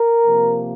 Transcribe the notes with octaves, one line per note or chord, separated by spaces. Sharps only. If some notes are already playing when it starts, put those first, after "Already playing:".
Already playing: A#4
C3 F3 A#3